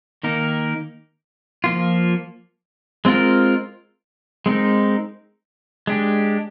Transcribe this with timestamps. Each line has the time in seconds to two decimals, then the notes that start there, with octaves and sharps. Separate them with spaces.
0.23 D#3 A#3 D#4 A#4
1.64 F3 A#3 F4
3.05 G#3 C4 F4 A#4
4.46 G#3 C4 D#4 A#4
5.87 G#3 D4 G4